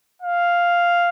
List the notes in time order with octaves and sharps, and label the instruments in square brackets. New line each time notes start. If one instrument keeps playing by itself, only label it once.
[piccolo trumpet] F5